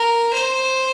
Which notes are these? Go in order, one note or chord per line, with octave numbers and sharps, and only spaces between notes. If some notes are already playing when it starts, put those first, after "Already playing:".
Already playing: A#4
C5